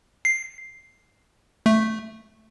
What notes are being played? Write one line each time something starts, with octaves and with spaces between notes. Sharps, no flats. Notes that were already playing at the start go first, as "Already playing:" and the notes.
C7
A3